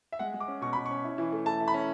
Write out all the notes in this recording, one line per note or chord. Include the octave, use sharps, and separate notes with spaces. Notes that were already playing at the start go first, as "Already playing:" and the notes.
E5
G#3 F#5
G#3
D6
C#4
B2 C#6
B2 B5
C#4 C#6
E4
E3
A3
A3 A5
E4
B5
C#4